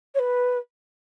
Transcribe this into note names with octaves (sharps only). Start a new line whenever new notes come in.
C#5
B4